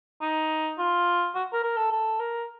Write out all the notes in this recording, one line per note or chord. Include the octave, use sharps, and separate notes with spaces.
D#4
F4
F#4
A#4
A#4
A4
A4
A#4